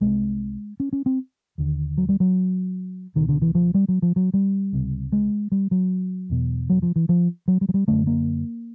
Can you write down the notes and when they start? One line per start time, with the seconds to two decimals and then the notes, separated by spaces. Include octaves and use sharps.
0.01 C2 C3 G#3
0.80 C#4
0.93 C#4
1.06 C4
1.58 D#2 D3
1.98 F#3
2.09 G3
2.20 F#3
3.15 C#2 B2 D#3
3.29 D3
3.42 E3
3.55 F3
3.74 G3
3.88 F#3
4.02 F3
4.16 F#3
4.34 G3
4.73 C#2 C3
5.12 G#3
5.52 G3
5.71 F#3
6.30 E2 B2
6.70 F#3
6.82 F3
6.96 E3
7.09 F3
7.48 F#3
7.61 G3
7.69 F#3
7.74 G3
7.88 F#2 D3 A3
8.07 A#3